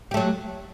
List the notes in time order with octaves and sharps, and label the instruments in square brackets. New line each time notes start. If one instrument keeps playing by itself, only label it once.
[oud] G4
A3
F#3